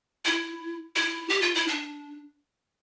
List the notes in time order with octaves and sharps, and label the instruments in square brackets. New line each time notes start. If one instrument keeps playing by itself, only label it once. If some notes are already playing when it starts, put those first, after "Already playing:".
[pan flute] E4
E4
G4
F4
E4
D4